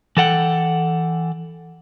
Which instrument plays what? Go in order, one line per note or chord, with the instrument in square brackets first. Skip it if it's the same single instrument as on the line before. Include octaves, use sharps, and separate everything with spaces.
[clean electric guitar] E3 A4 F#5 G5